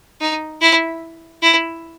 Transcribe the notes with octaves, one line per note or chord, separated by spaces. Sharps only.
D#4
E4
E4